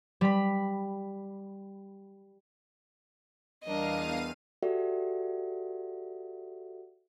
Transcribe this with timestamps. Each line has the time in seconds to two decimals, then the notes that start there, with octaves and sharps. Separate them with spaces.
0.21 G3 B5
3.64 E2 G3 D4 A#4 D#5 F5 D#7
4.63 F#4 G4 A4 D5 E5 F#5